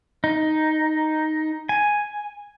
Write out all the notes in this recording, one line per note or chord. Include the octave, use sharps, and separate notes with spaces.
D#4
G#5